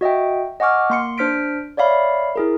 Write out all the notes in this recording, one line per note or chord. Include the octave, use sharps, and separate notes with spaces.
F#4 D#5 E5 G5
D#5 F#5 G#5 C#6 D6 F6
A#3 C6 C#7
D4 C5 F6 B6 D7
C#5 D5 E5 F5 B5
E4 G#4 A#4